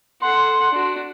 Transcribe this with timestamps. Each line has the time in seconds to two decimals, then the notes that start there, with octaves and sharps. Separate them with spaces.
0.22 A4 F#5 C6
0.71 D4 F#4